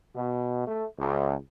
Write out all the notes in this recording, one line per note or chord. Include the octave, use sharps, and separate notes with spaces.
B2
A3
C#2